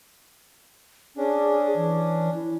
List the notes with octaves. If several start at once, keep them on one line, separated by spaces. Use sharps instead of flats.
C#4 D4 G#4
E3
E4